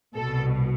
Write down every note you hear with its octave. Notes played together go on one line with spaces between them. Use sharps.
C2 B2 A4